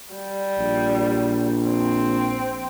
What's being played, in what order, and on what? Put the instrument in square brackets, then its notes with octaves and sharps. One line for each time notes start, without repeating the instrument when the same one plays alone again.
[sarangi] G3
[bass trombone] A#1
[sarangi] C4